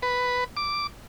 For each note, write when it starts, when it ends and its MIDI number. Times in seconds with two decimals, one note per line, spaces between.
0.03 0.44 71
0.57 0.87 86